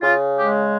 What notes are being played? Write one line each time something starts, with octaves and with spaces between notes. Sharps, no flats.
C#3 F4
G#3 G4